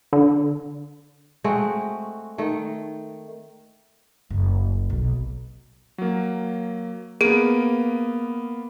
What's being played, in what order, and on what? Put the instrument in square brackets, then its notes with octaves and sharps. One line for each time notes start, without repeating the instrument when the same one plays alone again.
[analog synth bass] D3
[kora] G#3 A3 C4 F#4
D#3 A3
[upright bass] F#1
B1
[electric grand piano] F#3 A#3
[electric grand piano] A#3 B3 [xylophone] G#4 D7